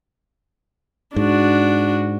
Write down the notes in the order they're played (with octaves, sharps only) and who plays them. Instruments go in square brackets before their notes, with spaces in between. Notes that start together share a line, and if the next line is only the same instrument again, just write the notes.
[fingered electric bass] G#2 [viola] D4 F#4